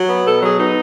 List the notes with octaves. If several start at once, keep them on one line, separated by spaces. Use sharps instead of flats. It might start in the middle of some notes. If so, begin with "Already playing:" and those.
Already playing: F#3
B3
B2 A4
F#3 G#4
B3 D#4